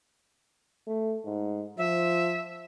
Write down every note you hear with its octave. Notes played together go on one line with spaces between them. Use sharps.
A3
G#2
F3 E5